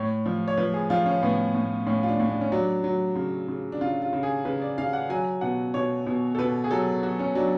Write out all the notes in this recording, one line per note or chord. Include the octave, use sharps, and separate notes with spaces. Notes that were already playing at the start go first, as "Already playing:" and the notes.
Already playing: A2 C#5
F3
C#5
F3 B4
G#4
F3 F4
C#4
A2 B3
A2
A2 C#4
F4
D4
A2
D4
C#4
F#3 D4
F#3
C#3
C#3
D4
C#3 F4
F4
C#3
G#4
C#3 B4
D5
C#3 F5
F#5
F#3 G#5
B2 F#5
B2 C#5
B2
A4
B2 B4
G#4
F#3 A4
F#3 F#4
C#4
F#3 D4